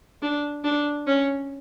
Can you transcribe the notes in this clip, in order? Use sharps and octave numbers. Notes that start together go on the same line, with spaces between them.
D4
D4
C#4